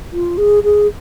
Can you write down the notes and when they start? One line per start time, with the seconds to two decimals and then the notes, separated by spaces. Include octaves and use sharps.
0.12 F4
0.38 G#4
0.63 G#4